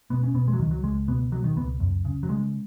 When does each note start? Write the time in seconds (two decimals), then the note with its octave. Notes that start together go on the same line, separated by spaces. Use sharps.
0.10 B2 B3
0.23 C#4
0.34 B2 B3
0.48 G#3
0.53 F#3
0.59 C#2 D#3
0.71 F#3
0.83 C#2 G#3
1.08 B2 B3
1.32 B2 F#3
1.44 D#3
1.56 C#2 B3
1.80 F#2
2.05 C#3
2.23 F#3
2.29 C#3 G#3